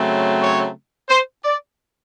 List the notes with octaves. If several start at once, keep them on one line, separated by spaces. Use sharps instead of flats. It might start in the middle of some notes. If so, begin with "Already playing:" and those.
Already playing: C#3 F#3 A3 C4
C#5
C5
D5